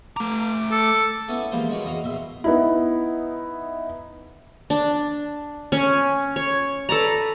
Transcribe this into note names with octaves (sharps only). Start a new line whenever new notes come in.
A3 A#5 D6
A4
B3 C#4 E4 A4 G#5 A5
E3 F3 G#3 A#3 G4 C5
G#3 D4 F#4 B4 C#5 D5
E2 F#4 D#5 F5
A#1 B2 E5 C6
B3 D#4 E4
D4
C#4
C#5
A4 B4 D5 A#5